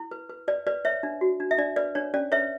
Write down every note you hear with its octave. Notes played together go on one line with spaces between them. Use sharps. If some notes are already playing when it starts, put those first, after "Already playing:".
Already playing: E4
B4
B4
B4 D5
B4 D5
B4 C#5 E5
D4
F#4
D4
E5
D4 D5
B4 D5
D4 C#5
C#4 D5
B4 C#5 E5